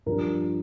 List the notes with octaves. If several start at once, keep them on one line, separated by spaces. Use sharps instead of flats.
G2 F3 A#4